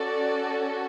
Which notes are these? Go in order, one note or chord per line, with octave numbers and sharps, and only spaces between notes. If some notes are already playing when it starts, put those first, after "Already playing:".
Already playing: C#4 F#4 A4 D5